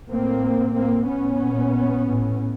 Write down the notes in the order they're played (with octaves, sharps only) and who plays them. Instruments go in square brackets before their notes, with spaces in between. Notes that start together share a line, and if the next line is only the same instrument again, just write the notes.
[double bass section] A2 A#3 C4
A2 A#3 C4
B3 C#4
A#2
A2